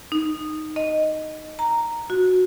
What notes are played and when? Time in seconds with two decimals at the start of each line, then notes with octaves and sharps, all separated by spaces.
0.12 D#4
0.76 D#5
1.59 A#5
2.10 F#4